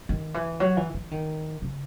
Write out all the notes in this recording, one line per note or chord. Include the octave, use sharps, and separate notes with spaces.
D#3
E3
F#3
E3
E3
D#3
C#3